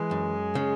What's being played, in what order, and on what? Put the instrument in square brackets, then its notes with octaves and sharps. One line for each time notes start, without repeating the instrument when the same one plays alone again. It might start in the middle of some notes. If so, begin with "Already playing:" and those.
Already playing: [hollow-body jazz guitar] E3 [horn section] G#3
[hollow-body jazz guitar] F#2
C#3